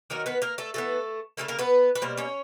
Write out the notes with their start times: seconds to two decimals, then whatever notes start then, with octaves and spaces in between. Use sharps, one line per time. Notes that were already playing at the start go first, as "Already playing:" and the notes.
0.10 D#3 F#3 A#3 A#4
0.26 B3 B4
0.42 A#3 A#4
0.58 A3 A4
0.74 E3 G#3 A3 B3 A4
1.37 C#3 F#3 A3 A#3 A4
1.48 A#3 A#4
1.59 B3 B4
1.95 B4
2.02 B2 G3 A#3 C5
2.17 C#4 C#5